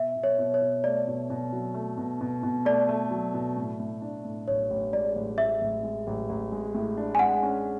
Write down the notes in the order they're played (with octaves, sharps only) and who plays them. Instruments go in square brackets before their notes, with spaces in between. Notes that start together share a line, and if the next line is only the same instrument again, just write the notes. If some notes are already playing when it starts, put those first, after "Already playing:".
Already playing: [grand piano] B2 [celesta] E5
[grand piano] B2
[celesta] C#5
[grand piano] B2
[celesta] C#5
[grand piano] B2
[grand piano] A3 [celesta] D5
[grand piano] B2
B2
F#3
A3
B2
B2
B2
[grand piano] A3 [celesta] D5
[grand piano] A3
F#3
B2
A2
A2
D4
A2
[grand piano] A1 [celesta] C#5
[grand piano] A1
[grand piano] G#3 [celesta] D5
[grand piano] A1
[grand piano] A2 [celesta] E5
[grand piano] A1
G#3
A1
A1
G#3
A2
D4
[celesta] G#5
[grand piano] G#3 [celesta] F#5
[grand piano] C#4